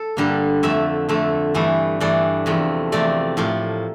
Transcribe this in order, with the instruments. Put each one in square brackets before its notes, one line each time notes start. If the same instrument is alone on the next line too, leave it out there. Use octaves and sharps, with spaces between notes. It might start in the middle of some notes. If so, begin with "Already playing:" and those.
Already playing: [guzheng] A4
G2 D3 G3 A#3
F2 D3 A3 E5
F2 D3 A3
G2 E3 A3
G2 E3 A3 D5
E2 C3 F3 A3
E2 C3 F3 A3 D5
A2 F3 A#3